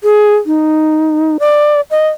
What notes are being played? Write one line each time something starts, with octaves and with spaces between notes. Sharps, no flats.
G#4
D#4
D5
D#5